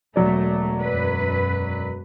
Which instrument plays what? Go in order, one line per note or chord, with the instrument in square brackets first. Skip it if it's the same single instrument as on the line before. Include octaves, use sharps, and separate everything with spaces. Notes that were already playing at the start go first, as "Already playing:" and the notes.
[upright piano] E1 F#3 D5 [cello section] A3
[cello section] F#2 B4